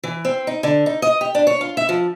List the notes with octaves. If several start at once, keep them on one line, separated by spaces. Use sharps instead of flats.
E3
C4
D#4
D3
D#4
D#5
G4
D4
C#5
F4
E5
F3